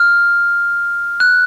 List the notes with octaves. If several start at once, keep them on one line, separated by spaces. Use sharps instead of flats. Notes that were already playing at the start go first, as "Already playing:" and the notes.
Already playing: F6
F#6